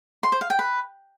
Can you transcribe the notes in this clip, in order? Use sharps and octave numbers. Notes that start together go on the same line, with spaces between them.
C6
C5
F5
G5
B4